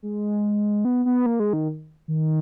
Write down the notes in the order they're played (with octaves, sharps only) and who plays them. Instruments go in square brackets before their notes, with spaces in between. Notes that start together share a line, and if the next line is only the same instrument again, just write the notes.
[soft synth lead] G#3
B3
B3
A#3
G#3
D#3
D#3